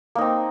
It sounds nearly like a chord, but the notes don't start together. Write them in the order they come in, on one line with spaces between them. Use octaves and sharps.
A#3 D#4 C4